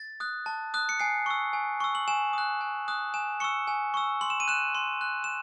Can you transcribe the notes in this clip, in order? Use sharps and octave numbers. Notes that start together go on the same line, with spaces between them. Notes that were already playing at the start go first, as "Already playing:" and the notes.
Already playing: A6
D#6 F#6
A5
D#6 F#6
C#7
G#5 C7
C#6 E6
G#5
C#6 E6
F#7
G#5 E7
D#6 F#6
G#5
D#6 F#6
G#5 E7
C#6 E6 C#7
G#5
C#6 E6
C6 F#7
E7
D#7
F#6 E7
C6
F#6
E7